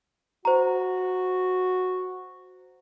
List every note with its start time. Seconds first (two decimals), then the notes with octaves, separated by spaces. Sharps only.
0.45 F#4 C5 A#5